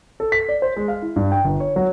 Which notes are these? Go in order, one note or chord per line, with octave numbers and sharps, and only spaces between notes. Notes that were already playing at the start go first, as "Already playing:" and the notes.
A4
B6
D5
C5
G#3
F5
E4
G2
G5
G1
C#5
F#3